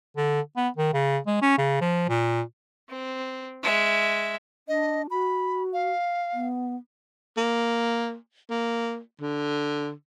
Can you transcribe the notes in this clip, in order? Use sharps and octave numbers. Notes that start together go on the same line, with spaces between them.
D3
B3
D#3
C#3
G#3
C#4
C#3
F3
A#2
C4
G#3 E5
D4 D#5
F#4 B5
F5
B3
A#3
A#3
D3